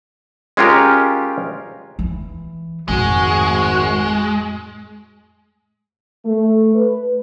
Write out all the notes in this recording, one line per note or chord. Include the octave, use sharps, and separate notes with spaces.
G#3 C#4 F4 G4 A#4
E3
G#1 F2 A2 G#3 F#4
A3
B4